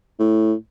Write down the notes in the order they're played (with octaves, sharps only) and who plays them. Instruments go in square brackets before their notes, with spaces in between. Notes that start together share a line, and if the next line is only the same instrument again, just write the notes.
[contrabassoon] A2